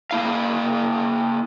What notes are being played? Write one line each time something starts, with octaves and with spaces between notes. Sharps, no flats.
A#3 E4 F5